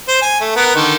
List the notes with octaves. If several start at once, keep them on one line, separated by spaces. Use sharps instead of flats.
C5
G#5
A3
B3 A#4
D3 D#3